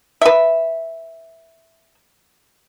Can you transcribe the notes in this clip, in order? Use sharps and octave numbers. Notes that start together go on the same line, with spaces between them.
B4 E5